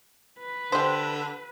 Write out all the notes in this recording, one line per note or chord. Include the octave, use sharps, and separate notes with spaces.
B4
D3 G4 C5